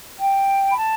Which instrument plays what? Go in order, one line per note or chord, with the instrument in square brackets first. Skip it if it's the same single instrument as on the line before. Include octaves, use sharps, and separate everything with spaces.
[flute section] G5
B5
A5